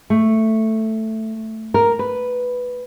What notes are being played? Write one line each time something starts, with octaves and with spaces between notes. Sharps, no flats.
A3
A#4
B4